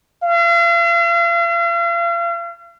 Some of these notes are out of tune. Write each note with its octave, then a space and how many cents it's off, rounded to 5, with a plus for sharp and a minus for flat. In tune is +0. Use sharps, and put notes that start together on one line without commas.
F5 -40